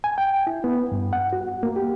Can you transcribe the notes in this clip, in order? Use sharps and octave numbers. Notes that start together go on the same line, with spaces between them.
G#5
G5
E4
B3
G2
F#5
F#4
A#3
G4